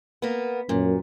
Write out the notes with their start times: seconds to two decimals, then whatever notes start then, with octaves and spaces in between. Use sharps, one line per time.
0.22 A#3 B3
0.69 F#2 A#2